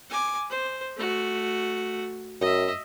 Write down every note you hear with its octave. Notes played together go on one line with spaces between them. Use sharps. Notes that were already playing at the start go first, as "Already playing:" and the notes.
G#5 D6
C5
A3 F#4
F#2 D#5 E5